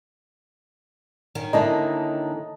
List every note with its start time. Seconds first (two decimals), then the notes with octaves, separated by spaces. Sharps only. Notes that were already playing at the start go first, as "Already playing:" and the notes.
1.35 D#3 C#4
1.53 D3 A#3 E4 D#5 A5 A#5